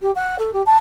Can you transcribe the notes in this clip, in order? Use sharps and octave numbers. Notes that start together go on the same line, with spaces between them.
G4
F#5
A4
G4
A5